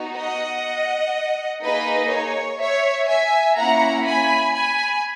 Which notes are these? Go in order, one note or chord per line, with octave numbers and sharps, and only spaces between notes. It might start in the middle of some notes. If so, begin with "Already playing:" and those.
Already playing: B3 D#4 F#4
D#5 F#5
A#3 D#4 G#4 B4 D#5
C#5
C#5 E5
E5 G#5
A#3 C#4 E4 F#5 A#5
G#5 B5
G#5 B5